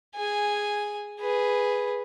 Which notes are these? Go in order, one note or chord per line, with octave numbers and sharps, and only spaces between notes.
G#4 G#5
G#4 B4